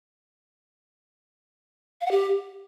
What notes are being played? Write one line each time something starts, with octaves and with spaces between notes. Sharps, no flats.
F5
F#5
G4